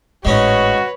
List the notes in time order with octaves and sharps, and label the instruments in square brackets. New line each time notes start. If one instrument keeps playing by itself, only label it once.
[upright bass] G#1 A2 [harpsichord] G#3 C#4 D#4 [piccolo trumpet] F#4 [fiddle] B4 C#5